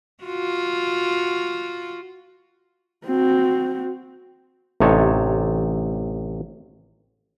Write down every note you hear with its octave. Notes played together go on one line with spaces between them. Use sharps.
F4 F#4
C4 F#4
A1 C3 D#4 C#5 A5